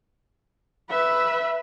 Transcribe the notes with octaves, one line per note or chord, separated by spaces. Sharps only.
B4 E5